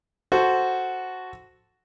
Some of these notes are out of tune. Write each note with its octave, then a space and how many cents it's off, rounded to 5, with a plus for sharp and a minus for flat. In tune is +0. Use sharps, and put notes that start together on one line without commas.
F#4 +0 A4 +0 C5 +0